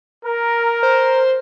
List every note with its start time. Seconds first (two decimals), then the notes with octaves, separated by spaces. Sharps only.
0.24 A#4
0.83 C5